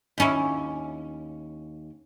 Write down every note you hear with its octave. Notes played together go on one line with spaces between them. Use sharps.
D#2 C#4 E4